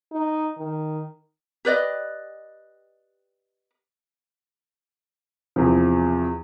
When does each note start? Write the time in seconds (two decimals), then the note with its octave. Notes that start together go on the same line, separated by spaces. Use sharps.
0.12 D#4
0.58 D#3
1.65 G4 B4 D5 D#5
5.56 E2 C3 F3